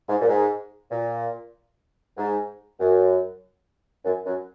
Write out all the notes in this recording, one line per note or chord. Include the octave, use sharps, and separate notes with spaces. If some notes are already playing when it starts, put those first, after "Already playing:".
G#2
A#2
G#2
A#2
G#2
F#2
F#2
F#2